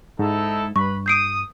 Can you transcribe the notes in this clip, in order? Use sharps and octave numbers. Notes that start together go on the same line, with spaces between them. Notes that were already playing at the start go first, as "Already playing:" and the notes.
G#2 D#4 E4 A4
G2 B4 B5 C#6
D#6 G6 C7 D7